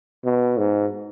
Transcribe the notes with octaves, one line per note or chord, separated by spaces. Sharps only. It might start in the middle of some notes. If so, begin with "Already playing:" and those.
B2
G#2